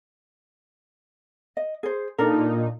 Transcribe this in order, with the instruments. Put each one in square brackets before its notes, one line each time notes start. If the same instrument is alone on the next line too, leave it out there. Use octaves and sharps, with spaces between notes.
[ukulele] D#5
G#4 C5
[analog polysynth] A#2 D#4 [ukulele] D4 A4 A#4